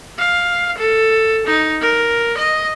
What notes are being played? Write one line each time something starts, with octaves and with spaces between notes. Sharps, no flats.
F5
A4
D#4
A#4
D#5